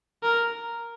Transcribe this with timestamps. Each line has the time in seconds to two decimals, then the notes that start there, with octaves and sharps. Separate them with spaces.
0.23 A#4